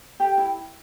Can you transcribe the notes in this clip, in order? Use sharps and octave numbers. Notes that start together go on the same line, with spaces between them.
G4
E4